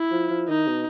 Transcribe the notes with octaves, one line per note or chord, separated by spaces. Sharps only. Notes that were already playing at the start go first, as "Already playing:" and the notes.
Already playing: E4
F3
F3
D#3 D#4
B2